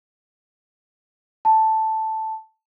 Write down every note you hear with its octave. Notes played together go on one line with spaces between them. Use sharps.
A5